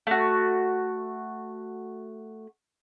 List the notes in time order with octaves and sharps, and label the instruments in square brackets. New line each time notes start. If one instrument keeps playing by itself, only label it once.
[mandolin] A3 F#4